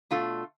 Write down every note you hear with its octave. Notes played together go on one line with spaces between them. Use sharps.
B2 A3 D4 F4